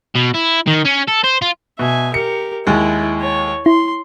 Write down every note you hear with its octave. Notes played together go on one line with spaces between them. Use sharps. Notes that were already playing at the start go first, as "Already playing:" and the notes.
B2
E4
D#3
C#4
A4
C5
F4
B2 E5 G#5
G4 A#4 C#7
D#2 G#3 E4
C#5
E4 C6